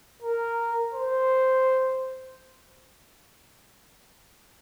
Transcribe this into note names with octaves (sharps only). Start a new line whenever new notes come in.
A#4
C5